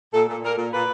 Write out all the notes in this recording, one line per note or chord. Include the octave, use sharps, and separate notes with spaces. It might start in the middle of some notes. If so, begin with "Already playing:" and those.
A#2 A4
A#2
A#2 A#4
A#2
A#2 B4